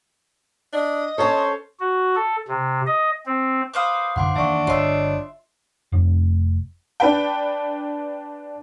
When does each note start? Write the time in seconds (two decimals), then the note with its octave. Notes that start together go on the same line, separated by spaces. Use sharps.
0.73 D4 D#5
1.18 C#4 A4 C5 C#5 A5
1.80 F#4
2.16 A4
2.48 C3
2.86 D#5
3.26 C4
3.74 B4 C5 F5 D6 D#6
4.16 F#2 D3 F#3 F#5 C6 D6
4.36 D#3 E3 A#3 D4 E5 F#5 C#6
4.67 G1 F4 C#5 D#5 E5 C6
5.92 F1
7.00 D4 B4 G5